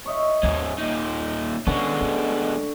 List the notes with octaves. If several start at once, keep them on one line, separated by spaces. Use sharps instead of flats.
C#5 D#5 E5
D#2 G#2 C#4
A#2 D#4
D3 D#3 G#3 B3 C#4
A3